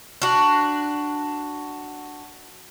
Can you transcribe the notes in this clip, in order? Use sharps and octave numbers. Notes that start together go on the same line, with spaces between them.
D4 F#4